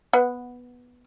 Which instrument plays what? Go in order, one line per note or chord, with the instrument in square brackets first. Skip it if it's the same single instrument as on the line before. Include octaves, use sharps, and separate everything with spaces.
[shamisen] B3 F#5